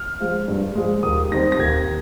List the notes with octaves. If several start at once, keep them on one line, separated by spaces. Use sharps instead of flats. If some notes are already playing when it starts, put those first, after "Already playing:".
Already playing: F6
F3 G#3
G2
F3 G#3
D#2 D#6
D#3 G3 C4 A#6
A#6
D#2 G#6